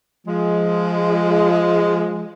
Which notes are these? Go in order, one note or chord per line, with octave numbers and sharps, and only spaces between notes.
F3 G#3